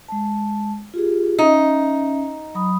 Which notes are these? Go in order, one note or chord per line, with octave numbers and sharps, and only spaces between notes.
G#3 A5
F4 G4 G#4
C#4 D#4 E5
F#3 B5 D#6